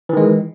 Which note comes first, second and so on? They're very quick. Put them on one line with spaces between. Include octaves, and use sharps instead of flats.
E3 D#3 G#3